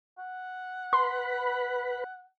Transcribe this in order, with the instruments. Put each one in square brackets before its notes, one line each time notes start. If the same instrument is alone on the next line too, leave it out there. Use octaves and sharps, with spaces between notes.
[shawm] F#5
[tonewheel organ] B4 B5 [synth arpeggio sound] C6